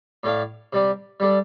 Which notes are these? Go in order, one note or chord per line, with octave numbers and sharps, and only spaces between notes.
A2 A3 D4 A4 F5
C3 G3 D4
G3 D4 A4